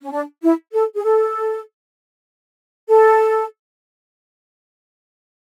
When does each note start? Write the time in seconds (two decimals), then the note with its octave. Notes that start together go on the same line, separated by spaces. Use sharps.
0.02 C#4
0.11 D4
0.42 E4
0.73 A4
0.95 G#4
1.04 A4
2.89 A4